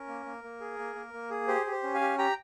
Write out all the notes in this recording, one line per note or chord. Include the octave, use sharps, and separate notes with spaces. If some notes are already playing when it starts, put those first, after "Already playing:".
Already playing: C#4 A#4
A#3
A#3
A#3
G#4
A#3
A#3
A#3
G#4
G4 C5
G4
C5
C#4
F5 G#5
G4
G4 G5 A#5